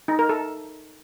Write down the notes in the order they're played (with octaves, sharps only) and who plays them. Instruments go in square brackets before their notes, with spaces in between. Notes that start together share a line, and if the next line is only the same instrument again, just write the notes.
[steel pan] D#4
A#4
A4